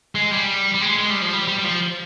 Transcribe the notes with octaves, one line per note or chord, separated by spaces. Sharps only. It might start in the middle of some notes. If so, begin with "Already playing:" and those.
G#3
G3
G3
G#3
G#3
G3
F3
G3
G3
G3
F3